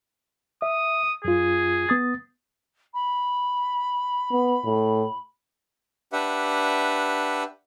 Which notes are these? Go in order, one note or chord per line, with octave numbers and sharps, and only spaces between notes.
E5 D#6
F#2 F4 G#4
B3 D#6 A6
B5
B3
A2
D4 G4 B4 E5 F#5